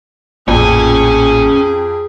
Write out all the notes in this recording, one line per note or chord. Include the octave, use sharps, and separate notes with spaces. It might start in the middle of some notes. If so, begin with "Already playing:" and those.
A1 F2 A#2 C#4 G#4 G#5